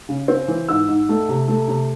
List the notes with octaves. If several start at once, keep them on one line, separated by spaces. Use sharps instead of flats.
C#3
C4
E3
G#2 E6
G#2
A3
C3
A3
C3